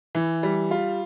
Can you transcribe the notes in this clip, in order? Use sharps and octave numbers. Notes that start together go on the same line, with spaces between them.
E3
G3
F4